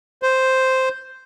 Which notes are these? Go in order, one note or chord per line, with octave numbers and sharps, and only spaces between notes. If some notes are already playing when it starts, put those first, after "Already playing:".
C5